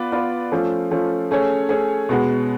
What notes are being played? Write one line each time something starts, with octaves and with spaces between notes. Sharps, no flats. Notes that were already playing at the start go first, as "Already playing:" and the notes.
Already playing: B3 F4 B4 D5
B3 F4 B4 D5
F3 A3 C#4 F4
F3 A3 C#4 F4
A3 C#4 G#4 C#5
A3 C#4 G#4 C#5
B2 G#3 B3 F#4